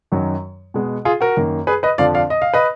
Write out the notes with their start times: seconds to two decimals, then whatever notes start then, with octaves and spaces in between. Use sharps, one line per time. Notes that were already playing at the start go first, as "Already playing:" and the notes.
0.12 F#2 D#3 F#3
0.74 B2 G#3 B3
1.05 F4 G#4
1.21 F#4 A#4
1.37 F#2 D#3 A#3
1.67 G#4 B4
1.83 B4 D#5
1.98 F2 D3 F3 D5 F5
2.14 D5 F5
2.30 D#5
2.42 F5
2.54 B4 D#5